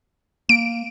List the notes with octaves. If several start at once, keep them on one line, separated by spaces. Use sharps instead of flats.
A#3 D7